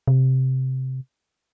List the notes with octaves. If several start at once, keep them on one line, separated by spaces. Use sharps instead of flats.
C3